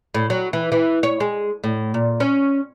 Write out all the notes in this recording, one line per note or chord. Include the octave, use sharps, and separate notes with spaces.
A2
F#3
E3
E3
C#5
G#3
A2
A#2
C#4